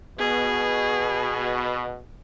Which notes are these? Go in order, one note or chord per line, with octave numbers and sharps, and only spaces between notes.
B2 G#4